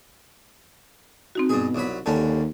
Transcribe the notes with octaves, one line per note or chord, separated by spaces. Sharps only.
C4 D#4 F#4
G2 B2 G#4
C2 F#3 B5
D#2 D3 G3 C#4 A5